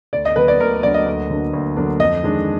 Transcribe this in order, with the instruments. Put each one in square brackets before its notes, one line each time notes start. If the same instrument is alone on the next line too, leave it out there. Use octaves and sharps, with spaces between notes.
[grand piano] D2 [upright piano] D5
[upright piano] D#5
[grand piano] D3 F#3 A#3 D4 [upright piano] B4
[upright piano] D5
[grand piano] D2 [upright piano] A#4
[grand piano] D3 F#3 A#3 D4 [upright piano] D5
[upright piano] D#5
[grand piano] D2
D3 F#3 A#3 D4
D2
D3 F#3 A#3 D4
[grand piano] F2 [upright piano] D#5
[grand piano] D#3 G#3 D4